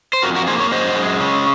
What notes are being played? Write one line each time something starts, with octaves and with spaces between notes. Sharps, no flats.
C5
F2 F#4 A#4
F#4 A#4
A#3 G#4 C5
A#4 C#5
F#2 C5 D#5
G#3
C#3